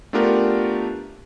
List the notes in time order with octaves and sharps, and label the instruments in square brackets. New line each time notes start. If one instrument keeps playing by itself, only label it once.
[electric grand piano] A3 B3 D4 F4 G4 A#4